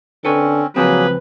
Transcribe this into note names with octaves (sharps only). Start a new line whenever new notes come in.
D3 C4 C#4 A4 B4 C#5
C#2 F3 F#3 A#3 C4 G#4 B4